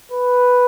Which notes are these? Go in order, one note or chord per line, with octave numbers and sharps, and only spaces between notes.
B4